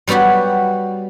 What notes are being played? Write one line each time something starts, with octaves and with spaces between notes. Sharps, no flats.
F#3 G3 B3 F#4 G4